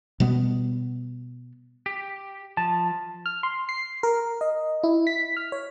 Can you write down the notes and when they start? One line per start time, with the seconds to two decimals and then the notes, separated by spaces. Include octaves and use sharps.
0.20 B2 G3 B3
1.86 G4
2.57 F3 A5
3.26 F6
3.43 C6
3.69 C7
4.03 A#4
4.41 D#5
4.83 E4
5.07 B6
5.37 F6
5.52 C#5